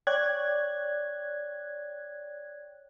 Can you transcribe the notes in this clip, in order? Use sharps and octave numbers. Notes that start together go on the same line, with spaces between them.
C#5 D5 G5 F#6 G#6